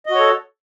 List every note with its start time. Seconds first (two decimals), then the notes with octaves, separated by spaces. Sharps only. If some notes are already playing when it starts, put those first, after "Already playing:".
0.06 D#5
0.10 F#4
0.15 C#5
0.19 A4